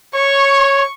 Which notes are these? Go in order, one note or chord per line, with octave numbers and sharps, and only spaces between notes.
C#5 C#6